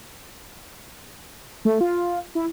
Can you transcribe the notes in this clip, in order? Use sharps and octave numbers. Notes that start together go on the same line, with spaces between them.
A3
F4
E4